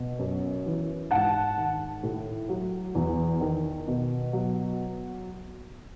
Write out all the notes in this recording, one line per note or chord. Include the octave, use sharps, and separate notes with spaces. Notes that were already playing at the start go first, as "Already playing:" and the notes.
Already playing: B2
F#2
E3
G#2 F#5 A5
D#3
A2
F#3
E2
D#3
B2
F#3